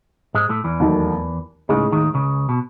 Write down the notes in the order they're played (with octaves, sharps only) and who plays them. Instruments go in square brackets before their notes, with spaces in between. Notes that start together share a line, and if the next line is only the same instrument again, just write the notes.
[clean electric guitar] G#2 G#3
A2 A3
E2 E3
[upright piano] D#2 D#3 F#3 A3 D#4
[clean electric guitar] C#2 C#3 [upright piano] A2 G#3 D#4
[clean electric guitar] D#2 D#3
C#2 C#3
B2